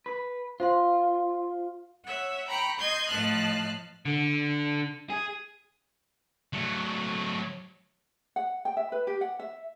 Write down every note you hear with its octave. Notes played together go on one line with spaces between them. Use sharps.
B4
F4 C5 F5 C6
C#5 E5 F#5
G5 A#5 B5 C#6
D#5 C6 G6 G#6
A2 F3 D#5 A5 F6 F#6
D3
G#4
F#3 A3
F#5
G5
E5
B4
G4
F#5
E5